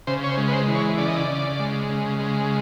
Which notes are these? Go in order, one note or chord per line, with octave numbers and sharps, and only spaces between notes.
C#3 C5
C#5
C5
G#3
B4
C5
E3
C#5
C#3 D5
D#5
D5
C#3
G#3
C#3
G#3